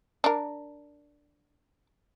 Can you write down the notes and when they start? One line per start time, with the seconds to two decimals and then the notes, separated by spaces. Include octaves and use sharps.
0.24 D4 A#4